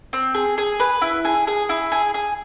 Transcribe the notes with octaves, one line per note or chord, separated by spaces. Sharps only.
C4
G#4
G#4
B4
E4
G#4
G#4
E4
G#4
G#4